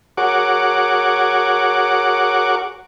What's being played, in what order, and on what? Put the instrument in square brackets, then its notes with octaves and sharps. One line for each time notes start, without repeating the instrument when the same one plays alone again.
[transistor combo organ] F#4 G#4 A#4 C#5 F#5 D6